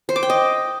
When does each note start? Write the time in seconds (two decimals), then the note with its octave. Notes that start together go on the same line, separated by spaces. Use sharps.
0.09 C5
0.16 D6
0.23 G5
0.30 D#5